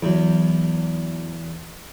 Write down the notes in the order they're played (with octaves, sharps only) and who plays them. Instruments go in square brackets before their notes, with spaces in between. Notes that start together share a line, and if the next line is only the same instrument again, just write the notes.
[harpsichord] E2 [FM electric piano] E3 F#3